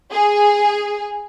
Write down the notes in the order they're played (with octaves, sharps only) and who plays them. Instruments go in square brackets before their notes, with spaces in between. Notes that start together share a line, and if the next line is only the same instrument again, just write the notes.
[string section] G#4